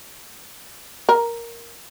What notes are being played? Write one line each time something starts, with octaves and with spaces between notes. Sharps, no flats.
A#4